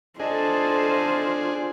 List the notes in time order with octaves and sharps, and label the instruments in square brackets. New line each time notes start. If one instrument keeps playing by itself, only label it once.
[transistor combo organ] D4 G#4 [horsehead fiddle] F4 C5 [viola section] A4 [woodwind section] D#5 A5